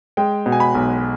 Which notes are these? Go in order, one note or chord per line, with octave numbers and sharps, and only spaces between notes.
G#3 G5
B2
G#5
B5
B1